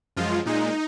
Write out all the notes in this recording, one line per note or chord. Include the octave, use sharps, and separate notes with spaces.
F#2 F3 G#3 F4
A#2 G#3 D#4